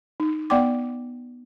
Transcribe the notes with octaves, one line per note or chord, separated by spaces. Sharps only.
D#4
B3 D5 F#5 G5 C6 D6